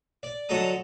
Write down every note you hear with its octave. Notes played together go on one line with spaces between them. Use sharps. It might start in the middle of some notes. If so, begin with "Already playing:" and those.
D5
D3 F#3 A4 D#5 A#5 D#6